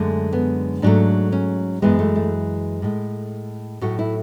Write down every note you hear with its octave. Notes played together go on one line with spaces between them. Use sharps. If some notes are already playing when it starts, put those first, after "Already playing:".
Already playing: F#2 D3 G#3 A3
B3
G#2 F#3 A3 D4
C#4
F#2 E3 G#3 B3
A3
A3
A2 G#3
A2 F#3 A3 F#4
E4